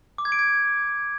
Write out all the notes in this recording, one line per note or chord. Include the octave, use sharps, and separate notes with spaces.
D6
G#6
D7
G#6